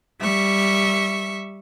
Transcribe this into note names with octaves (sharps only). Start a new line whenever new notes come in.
G3 E5 C#6